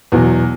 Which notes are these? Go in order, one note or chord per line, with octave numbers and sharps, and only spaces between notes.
E2 B2 F#3